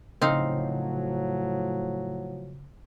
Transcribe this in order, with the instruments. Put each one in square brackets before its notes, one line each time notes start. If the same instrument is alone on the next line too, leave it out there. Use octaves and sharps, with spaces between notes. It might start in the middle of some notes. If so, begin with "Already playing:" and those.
[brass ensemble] A2 F3 F#3 [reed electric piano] C#3 [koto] C4 D#4 F5